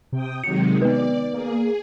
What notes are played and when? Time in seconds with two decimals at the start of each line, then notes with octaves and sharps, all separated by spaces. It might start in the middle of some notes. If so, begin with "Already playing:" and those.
0.13 C3 G5 D#6
0.44 C3 D#3 F#3 G#3 C#7
0.82 B3 B4 D5
1.34 A#3 G#4